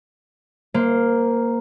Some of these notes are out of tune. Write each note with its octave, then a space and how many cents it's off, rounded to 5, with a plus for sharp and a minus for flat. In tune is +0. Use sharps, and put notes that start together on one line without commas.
A#3 +0 C5 -20